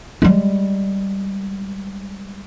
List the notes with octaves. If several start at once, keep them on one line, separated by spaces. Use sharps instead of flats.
G3 G#3